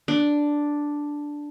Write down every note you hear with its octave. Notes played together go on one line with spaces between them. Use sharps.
D4